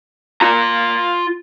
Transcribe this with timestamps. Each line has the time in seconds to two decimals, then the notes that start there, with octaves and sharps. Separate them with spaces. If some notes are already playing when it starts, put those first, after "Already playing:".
0.41 F4 A#5